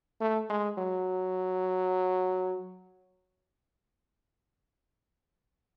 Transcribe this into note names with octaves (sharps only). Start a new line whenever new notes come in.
A3
G#3
F#3